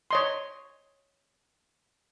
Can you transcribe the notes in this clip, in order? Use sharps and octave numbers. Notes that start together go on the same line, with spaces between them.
C#5 D#5 C6